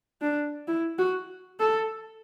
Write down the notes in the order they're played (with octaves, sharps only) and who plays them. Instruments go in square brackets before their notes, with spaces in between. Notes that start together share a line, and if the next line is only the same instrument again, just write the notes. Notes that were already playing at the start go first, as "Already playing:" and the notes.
[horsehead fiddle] D4
E4
F#4
A4